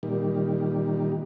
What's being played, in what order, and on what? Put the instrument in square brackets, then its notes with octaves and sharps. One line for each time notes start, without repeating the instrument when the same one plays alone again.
[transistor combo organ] A#2 D#3 G3